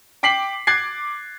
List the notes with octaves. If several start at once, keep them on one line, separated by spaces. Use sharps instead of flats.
G5 D6 B6 C7 F#7
D6 F#6 G#6 A6 C7